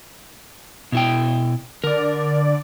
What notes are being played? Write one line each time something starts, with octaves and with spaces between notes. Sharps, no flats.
B2 E4 G5
D3 A#4 D5